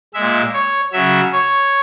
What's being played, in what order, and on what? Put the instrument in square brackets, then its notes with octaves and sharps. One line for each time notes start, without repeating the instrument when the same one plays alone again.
[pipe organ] A#2 G#3 E5
C#5
C#3 F#3 E5
C#5